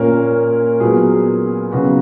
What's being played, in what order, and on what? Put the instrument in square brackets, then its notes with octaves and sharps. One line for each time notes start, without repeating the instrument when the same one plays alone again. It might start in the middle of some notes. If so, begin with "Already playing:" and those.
Already playing: [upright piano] A#2 A#3 C#4 A#4
A#2 F#3 B3 G#4
C#3 F#3 B3 F#4